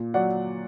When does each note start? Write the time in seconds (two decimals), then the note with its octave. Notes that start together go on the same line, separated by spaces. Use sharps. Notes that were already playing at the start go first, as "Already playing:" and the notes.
Already playing: A#2
0.14 F#3 D5 F#5